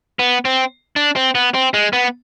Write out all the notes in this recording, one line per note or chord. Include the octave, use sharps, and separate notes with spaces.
B3
C4
D4
C4
B3
C4
G#3
B3